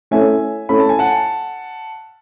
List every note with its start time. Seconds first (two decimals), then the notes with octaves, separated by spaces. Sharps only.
0.11 A3 C#4 E4 A4 C#5 E5 G#5
0.69 A3 C#4 E4 A4 C#5 B5
0.80 A5
0.89 G#5
0.99 F#5 A5